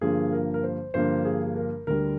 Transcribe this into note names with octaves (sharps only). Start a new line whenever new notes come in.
G2 D3 F3 A#3 G#4
A#4
A#4
C5
G2 D3 F3 A#3 C5
G#4
G#4
A#4
D2 D3 G3 A#4